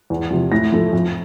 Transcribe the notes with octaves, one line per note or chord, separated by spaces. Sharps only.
E2
C3 F3
A2 A#6
F3 A3
F2